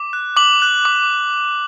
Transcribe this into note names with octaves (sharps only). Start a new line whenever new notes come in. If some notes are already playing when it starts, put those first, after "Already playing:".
Already playing: D6
F#6
D6 F#7
F#6
D6